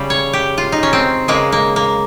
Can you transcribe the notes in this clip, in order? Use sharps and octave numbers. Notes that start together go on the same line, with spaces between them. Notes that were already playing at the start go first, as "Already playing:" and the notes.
Already playing: C#3 G3
C#5
G4
F4
D#4
C#4
C4
C#3 G#3 A#3
A#3
A#3